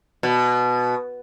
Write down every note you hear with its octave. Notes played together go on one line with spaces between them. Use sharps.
B2